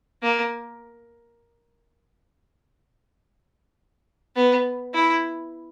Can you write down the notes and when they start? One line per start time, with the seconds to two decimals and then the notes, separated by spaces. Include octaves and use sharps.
0.23 A#3
4.36 B3
4.95 E4